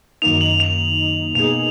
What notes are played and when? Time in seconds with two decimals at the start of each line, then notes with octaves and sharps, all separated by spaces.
0.22 F#2 D#3 A#3 D#4 F7
0.41 F#7
0.60 F7
1.35 B2 A#3 D#4 G#4 F7